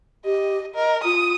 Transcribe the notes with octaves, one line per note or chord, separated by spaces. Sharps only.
G4 D#5
A#4 D#5
F4 D#6